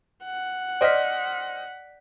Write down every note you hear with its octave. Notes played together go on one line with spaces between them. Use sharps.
F#5
C5 D5 D#5 F6 B6